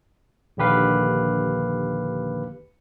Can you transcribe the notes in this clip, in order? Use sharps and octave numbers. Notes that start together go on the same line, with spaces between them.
A#1 D#2 D3 G4 B4 F5